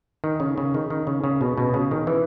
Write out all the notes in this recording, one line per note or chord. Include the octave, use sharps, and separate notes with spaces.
D#3
C#3
C#3
D#3
D#3
C#3
C#3
B2
B2
C#3
D#3
E3